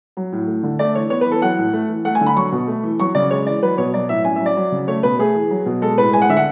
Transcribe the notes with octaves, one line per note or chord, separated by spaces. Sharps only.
F#3
A2
A3
D3
A3 D5
E3 C#5
B3 C#5
B4
E3
A4
F#3 F#5
A2
A3
E3
A3 F#5
G#5
D3
B5
F#3 C#6
B2
A3
E3
F#3 C#6
C#3 D5
G#3 C#5
E3 D5
F#3 B4
B2 C#5
F#3 D5
A2 E5
C#4 G#5
E5
F#3
D5
F#3
C#3
A3 C#5
B2 B4
A3 G#4
E3
F#3
B2
G#3 A4
A2 B4
G#3 G#5
F#5
D3 E5
F#5